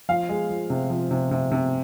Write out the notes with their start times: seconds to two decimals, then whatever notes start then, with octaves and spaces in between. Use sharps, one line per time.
0.09 F3 F5
0.29 G#3
0.50 F3
0.70 C3
0.90 F3
1.11 C3
1.31 C3
1.52 C3